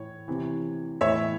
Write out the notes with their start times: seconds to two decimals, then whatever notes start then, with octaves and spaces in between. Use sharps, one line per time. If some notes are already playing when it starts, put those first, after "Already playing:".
Already playing: A2 E3 C#5
0.28 C3 E3
1.01 A2 E3 C#5 E5